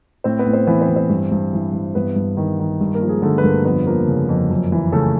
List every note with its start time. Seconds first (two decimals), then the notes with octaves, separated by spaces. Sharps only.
0.24 A2 C4 C5
0.39 B3 B4
0.46 A2
0.53 C4 C5
0.67 E3 B3 B4
0.81 C4 C5
0.89 E3
0.96 C4 C5
1.09 G2
1.31 G2
1.53 E3
1.73 E3
1.95 G2 B3 B4
2.16 G2
2.37 D#3
2.60 D#3
2.81 G2
2.94 A#3 A#4
3.02 F3
3.08 G#3 G#4
3.22 D3 A3 A4
3.38 B4
3.43 G2 A#3 A#4
3.65 F2 B3 B4
3.87 F3 A#3 A#4
4.07 C#3
4.29 F2
4.50 F#2
4.72 E3
4.92 C#3 A3 A4